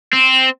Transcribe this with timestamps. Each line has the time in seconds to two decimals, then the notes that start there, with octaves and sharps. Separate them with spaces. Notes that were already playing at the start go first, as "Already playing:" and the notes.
0.13 C4